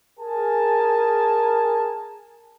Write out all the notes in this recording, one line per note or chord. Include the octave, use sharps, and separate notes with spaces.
G#4 A#4 G#5 A5